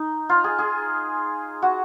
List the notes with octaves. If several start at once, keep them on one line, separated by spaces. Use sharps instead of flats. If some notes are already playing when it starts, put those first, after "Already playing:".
Already playing: D#4
F4
G#4
G#4
F#4